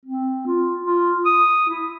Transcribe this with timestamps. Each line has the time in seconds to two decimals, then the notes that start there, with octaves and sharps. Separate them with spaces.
0.05 C4
0.46 F4
0.84 F4
1.25 D#6
1.69 E4